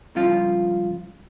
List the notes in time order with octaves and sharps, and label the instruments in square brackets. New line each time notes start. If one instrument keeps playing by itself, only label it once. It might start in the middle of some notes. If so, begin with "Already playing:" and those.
[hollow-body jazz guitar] C#2 G2 F3 C#4 F4